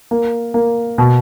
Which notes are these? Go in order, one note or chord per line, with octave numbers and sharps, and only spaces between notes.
A#3
A#3
B2